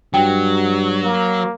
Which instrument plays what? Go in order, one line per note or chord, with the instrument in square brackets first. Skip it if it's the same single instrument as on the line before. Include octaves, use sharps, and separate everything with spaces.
[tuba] G2 [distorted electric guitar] F#3 [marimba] G5
[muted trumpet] A#3